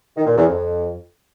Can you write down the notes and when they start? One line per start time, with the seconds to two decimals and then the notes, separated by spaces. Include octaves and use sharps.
0.16 D#3
0.26 A#2
0.36 E2
0.46 F2